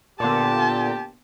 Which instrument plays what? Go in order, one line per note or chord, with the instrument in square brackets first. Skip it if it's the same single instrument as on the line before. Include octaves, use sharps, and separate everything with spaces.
[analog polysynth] A#2 D3 [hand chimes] B3 C6 D6 [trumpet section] G4 [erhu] A5